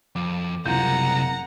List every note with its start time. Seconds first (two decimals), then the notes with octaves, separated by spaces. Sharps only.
0.16 F2 D6
0.66 F#1 C2 C3 F4 F#5 A#5 G6